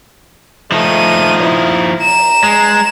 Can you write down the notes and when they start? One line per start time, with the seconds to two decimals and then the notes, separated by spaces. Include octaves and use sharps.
0.72 F3 A3 D#4 D#7
1.42 E4
2.00 A#5 E7
2.44 G#3